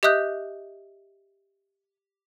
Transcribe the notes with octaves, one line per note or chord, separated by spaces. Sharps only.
G4 D#5 E5 D#6 F#6 G6